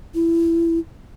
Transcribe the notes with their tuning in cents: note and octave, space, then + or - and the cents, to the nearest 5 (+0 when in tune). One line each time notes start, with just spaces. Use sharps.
E4 +20